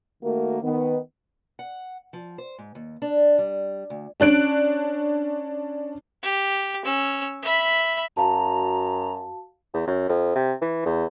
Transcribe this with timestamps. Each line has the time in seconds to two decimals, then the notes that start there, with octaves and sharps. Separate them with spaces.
0.23 D#3 A3 A#3 F#4 A#4
0.63 D#3 B3
1.59 F#5
2.13 F3
2.38 C5
2.58 G#2
2.75 D#2
3.02 D4
3.38 G3
3.90 D2
4.20 C#4 D4 F#6 D7
6.23 G4
6.85 C#4 E6
7.42 E5 B5
8.17 F#2 F#4 F5 A5 A#5
9.74 E2
9.87 F#2
10.09 F2
10.35 C3
10.61 E3
10.86 E2